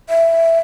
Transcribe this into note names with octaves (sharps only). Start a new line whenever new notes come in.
E5